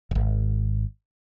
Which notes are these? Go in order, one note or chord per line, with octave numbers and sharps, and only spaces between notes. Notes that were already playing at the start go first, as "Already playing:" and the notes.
D1 G#1